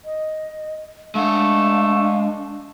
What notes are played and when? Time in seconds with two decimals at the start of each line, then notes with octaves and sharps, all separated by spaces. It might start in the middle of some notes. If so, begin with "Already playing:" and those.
0.05 D#5
1.15 G#3 A3 D4 F5 F#5